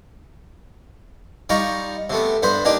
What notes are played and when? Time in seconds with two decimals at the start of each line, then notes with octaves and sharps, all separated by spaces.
1.49 G3 D#4 F4 A#5 C#6
2.10 C3 A3 B3
2.43 G2 B3 C5 B5
2.65 A#3 D4 D#4 G4